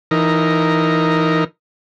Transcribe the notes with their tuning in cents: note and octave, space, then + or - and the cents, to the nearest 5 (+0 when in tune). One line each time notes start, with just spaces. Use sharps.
E3 +15 D#4 +0 A#4 +0